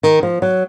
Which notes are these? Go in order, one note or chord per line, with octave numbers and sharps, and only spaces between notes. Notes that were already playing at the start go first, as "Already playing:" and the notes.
D#3
F3
F#3